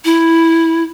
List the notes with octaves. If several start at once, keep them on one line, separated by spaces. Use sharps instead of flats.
E4